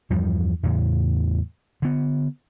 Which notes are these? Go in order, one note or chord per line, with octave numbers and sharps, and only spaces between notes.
E2 G2 F3 G3
E2 A2 C#3
D3 B3